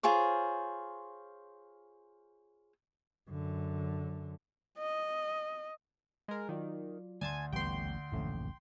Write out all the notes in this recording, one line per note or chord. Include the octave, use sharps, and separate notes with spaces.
F4 G#4 C5 C#5
F#2 D3
D#5
G#3 A#4
D#3 F#3 F4 D5
D2 D5 G#5 A5 C6 G#6
A1 D#2 G3 B3 G5 C6
D1 A#1 F#2 E3 A3 C#4